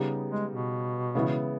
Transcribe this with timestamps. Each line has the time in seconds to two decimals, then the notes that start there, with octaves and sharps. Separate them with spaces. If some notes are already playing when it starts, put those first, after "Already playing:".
Already playing: C#3 G3 B3 D#4
0.31 G#3
0.52 B2
1.15 C#3 E3 G#3 B3 E4